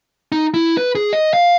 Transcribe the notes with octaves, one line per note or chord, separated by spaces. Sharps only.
D#4
E4
B4
G#4
D#5
F5